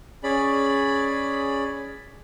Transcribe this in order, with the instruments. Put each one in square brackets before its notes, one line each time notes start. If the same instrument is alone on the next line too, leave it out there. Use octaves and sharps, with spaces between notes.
[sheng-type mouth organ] C#4 G#4 D5 B5